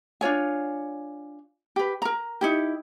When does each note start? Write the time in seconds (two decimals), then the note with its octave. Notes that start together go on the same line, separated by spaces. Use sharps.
0.21 D4 F4 C#5 G#5
1.76 G4 B4
2.02 A#4 A#5
2.41 D#4 E4 G4